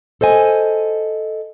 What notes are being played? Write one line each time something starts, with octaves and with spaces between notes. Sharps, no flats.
A4 C5 D#5 G#5